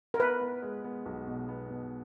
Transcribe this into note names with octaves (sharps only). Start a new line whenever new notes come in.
A#4
B3 B4
B3
G#3
B3
B1
B2
B3
B2